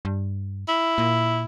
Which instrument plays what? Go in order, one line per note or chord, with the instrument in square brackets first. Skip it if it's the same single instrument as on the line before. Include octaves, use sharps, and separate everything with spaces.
[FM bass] G2
[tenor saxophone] E4
[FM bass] A#2